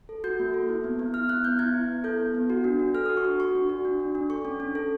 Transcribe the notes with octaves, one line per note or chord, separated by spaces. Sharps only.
A4
F#4 G6
A#3
A4
E4
B3
B3
E4 F6
B3 F#6
B3 G6
E4 G#6
E4
B3
A4 G6
B3
B3
F#4
D4
D4
A4 F6
F#4 D#6
C#6
F#4
F#4 C#6
D4
F#4
D4
D4
D4
A4 C#6
C#4
C#4
A4